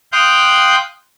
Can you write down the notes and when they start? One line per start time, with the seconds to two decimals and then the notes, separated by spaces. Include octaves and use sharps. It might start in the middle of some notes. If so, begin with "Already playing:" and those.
0.12 F5 G5 C6 D#6 F#6 G6